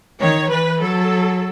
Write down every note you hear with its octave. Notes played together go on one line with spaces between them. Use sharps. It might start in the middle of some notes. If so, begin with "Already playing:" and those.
D#3 C#5
E3 B4
F#3 A4